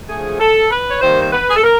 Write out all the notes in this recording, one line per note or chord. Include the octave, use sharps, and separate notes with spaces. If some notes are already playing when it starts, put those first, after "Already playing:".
D3 F3 A3 G#4
A4
B4
C#5
C3 D#3 G3 A#3 C5
C5
B4
G#4
A4
A#4